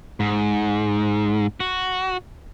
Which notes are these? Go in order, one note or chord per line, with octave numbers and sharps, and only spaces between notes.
G#2
F#4